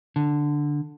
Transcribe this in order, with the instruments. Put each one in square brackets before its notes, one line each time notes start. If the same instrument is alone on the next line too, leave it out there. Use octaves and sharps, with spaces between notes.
[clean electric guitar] D3